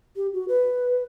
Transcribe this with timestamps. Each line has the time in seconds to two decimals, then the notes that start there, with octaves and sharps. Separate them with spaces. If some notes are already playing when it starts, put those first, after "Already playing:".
0.16 G4
0.34 F#4
0.48 B4